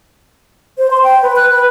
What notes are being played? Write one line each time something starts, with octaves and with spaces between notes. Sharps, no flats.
C5
C6
G5
B4
F#6
B4